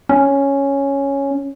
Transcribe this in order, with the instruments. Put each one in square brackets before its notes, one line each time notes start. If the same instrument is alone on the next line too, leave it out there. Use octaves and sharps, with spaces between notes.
[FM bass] C#4